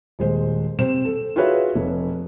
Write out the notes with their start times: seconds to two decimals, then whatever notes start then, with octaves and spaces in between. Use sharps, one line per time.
0.19 D#1 G#3 C5
0.79 C3 C5 E7
1.05 A4
1.36 F4 F#4 G#4 B4 C#5 E5
1.75 F1